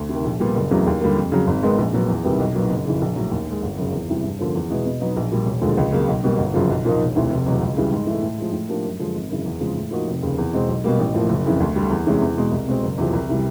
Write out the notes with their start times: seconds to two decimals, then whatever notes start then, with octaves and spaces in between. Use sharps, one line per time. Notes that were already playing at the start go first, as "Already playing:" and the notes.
Already playing: D2
0.09 C3
0.14 D#3
0.24 A#1
0.40 A#2 G3 B3
0.55 F#1
0.71 E2 C#3 F#3 A3
0.87 D#2
1.01 D3 G3 A#3
1.16 F2
1.32 C#3 F#3
1.47 G#1
1.63 G#2 D#3 G#3 B3
1.78 A#1
1.93 A#2 F#3 B3
2.09 E2
2.24 C3 D#3 G3 B3
2.40 B1
2.55 A#2 F#3 B3 D#4
2.70 F#1
2.86 F2 C#3 E3
3.01 A#1
3.16 A2 F#3
3.31 D#2
3.46 D#3 G#3
3.63 G1
3.77 F#2 C#3
3.92 E2
4.09 C3 E3 G3
4.24 G2
4.38 D3 F3 A#3 C#4
4.55 E2
4.70 B2 G#3 B3 E4
4.86 B2
5.00 F#3 B3 D#4
5.16 A#1
5.32 A#2 G3
5.46 E1
5.61 D#2 D3 F3 G#3
5.77 C#2
5.92 C#3 F#3 A#3
6.08 B1
6.24 B2 G3 A#3
6.38 G1
6.54 F#2 C#3 F3
6.70 B1
6.85 A#2 F3 A#3 D#4
7.01 E1
7.15 D2 C3 E3
7.30 F1
7.46 E2 B2 F#3
7.61 C#2
7.77 C#3 E3 G3
7.93 G#2
8.07 E3 A3
8.22 A2
8.38 F3 G#3
8.53 A2
8.69 F3 A#3 D4 G4
8.85 F#2
8.99 D3 F3 G#3
9.15 G#1
9.30 F#2 C#3 E3
9.45 E2
9.60 C#3 F3 G#3
9.76 A2
9.91 F3 A#3 D#4 F#4
10.07 F1
10.22 D#2 C#3
10.38 E2
10.53 B2 G#3 C4
10.68 B1
10.84 B2 G3 A#3
10.99 A1
11.14 A2 F3 A#3
11.29 F#1
11.45 F2 C#3 E3
11.60 D2
11.76 D3 G3
11.90 E2
12.07 C3 E3 G#3 C#4
12.22 E2
12.37 B2 G#3
12.52 C2
12.68 B2 G#3 C4
12.83 F#1
12.98 E2 C3 F3
13.13 C2
13.29 C3 E3 G3